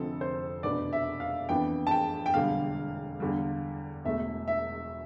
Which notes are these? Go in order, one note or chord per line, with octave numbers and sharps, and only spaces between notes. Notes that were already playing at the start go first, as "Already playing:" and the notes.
Already playing: F1 F2 D3 F3 C4 A4
C5
F1 E2 B2 B3 D4 D5
E5
F5
F2 E3 B3 D4 G5
A5
G5
G5
E1 E2 D3 G3 F5
E2 D3 G3
E1 E2 B2 A3 E5
E5